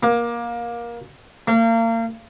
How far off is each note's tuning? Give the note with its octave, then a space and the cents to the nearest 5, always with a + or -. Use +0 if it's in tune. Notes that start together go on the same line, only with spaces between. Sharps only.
A#3 +20
A#3 -35